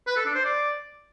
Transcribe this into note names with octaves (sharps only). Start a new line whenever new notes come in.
B4
A4
D4
C5
D5